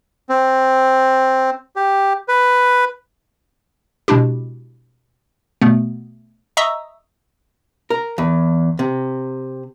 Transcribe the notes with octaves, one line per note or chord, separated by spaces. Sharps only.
C4
G4
B4
B2 G#3 D4 E4 G4
B2 A3 B3
D#5 E5 A#5 C#6 D#6 E6
A#4
E2
C3